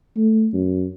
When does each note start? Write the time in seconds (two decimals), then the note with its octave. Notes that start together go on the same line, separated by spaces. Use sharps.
0.17 A3
0.53 F#2